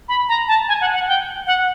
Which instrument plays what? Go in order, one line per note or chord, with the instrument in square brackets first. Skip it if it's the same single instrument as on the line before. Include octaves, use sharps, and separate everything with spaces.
[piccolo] B5
A#5
A5
G#5
F#5
F#5
G5
F#5